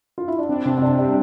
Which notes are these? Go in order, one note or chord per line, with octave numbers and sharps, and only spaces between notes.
F4
E4
D4
C4 D4
C3 C4
C4
C3 D4
G3 D4